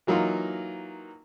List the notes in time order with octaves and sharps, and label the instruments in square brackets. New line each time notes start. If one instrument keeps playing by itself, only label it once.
[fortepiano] E3 F#3 A#3 D#4 F4